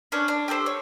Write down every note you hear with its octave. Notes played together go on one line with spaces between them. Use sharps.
C#4 D4 B4 C#5
D4
G4 A4 A#4 C5
C#5